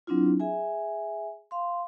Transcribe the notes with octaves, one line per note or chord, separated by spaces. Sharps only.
F#3 C4 D4 E4 F4
G#4 E5 G#5
F5 C6